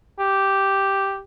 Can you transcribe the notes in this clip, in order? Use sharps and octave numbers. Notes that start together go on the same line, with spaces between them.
G4